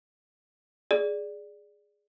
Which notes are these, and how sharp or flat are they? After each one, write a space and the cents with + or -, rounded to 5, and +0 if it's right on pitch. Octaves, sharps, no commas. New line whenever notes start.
G#4 +0 D5 +0